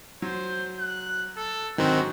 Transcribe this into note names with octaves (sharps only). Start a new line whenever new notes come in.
F#3 C5
F#6
A4
G#2 D3 D#3 F#3 C4 F#4